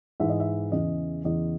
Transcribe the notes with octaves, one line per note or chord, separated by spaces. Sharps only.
G#2 E3 E5
D#5
E5
E2 C#3 E3 D#5
E2 C#3 E3 D#5